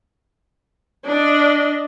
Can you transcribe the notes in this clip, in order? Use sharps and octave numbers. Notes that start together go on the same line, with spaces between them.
D4 D#5